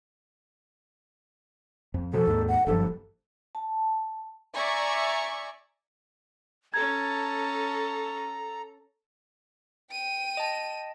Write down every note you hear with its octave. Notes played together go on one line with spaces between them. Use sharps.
F2
B2 F3 A4
D#2 G#2
F#5
F#1 G2 F3 A4
A5
D5 E5 G#5 A#5 C#6
C#4 A4 A5 A#5 G#6
G5 D#7
D#5 A5